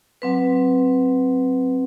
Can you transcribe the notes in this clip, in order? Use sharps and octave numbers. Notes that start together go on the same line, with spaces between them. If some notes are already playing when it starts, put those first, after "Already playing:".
F#3 C4 B4